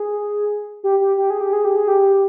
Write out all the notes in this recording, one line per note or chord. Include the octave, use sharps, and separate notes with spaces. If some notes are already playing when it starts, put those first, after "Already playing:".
Already playing: G#4
G4
G4
G4
G#4
G4
G#4
G4
G#4
G4